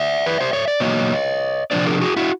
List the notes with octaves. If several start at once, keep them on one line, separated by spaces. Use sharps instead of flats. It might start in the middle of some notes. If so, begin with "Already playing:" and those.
Already playing: D5 E5
B4
C5
C#5
D5
B2 F#3 A#3 C#5 D#5
C3 F3 A#3 D4 C5 D5
G#4 A#4
F#4 G#4
E4 F#4